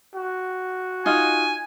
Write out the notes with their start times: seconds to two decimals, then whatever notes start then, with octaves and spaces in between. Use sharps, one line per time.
0.15 F#4
1.06 D#4 F4 G#5